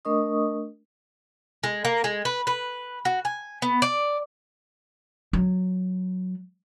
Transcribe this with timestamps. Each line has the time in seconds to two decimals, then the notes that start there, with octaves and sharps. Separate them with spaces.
0.05 A3 D4 A#4 D#5 C#6 D#6
1.64 G#3
1.85 A#3
2.04 G#3
2.25 B4
2.47 B4
3.05 F#4
3.25 G#5
3.62 B3
3.82 D5
5.33 F#3